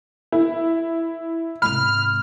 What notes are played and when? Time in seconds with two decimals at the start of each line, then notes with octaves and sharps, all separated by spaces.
0.32 E4
1.62 G#2 C3 B5 F6